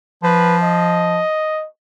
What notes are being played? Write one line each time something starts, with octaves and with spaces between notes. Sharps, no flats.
F3 B4
D#5